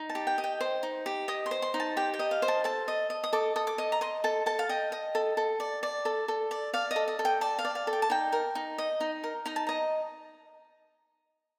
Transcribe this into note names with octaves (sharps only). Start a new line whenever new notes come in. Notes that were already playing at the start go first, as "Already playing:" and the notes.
Already playing: D#4
A5
G4
G5
D#5
G5
C5
D#4
G4
D#5 D#6
C6
C5
C6
D#4
A5
G4 G5
G5
D#5
F5
C5
A5
A4 A5
D#5
D#5
D#6
A4 D6
A4 D#6
D6
D#5
A#5
D#5 C6
A4 A5
A4 A5
F5
D#5 G5
D#5
A4
A4
D5
D5
A4
A4
D5
D5 F5
D#5
A4
D#5
A4
G5
D5 A5
F5
D5
F5
A4
G5
A5
D#4 G5
A#4
D#4
D#5
D#4
A#4
D#4 A#5
A5
D#5 A#5